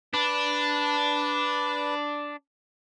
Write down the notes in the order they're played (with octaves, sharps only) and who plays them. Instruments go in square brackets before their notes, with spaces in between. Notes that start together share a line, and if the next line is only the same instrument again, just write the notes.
[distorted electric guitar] D4 [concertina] B4